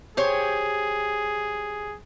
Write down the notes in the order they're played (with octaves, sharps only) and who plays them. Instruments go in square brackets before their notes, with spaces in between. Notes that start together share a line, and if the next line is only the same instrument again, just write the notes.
[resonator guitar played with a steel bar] G4 C5 C#5 [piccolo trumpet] G#4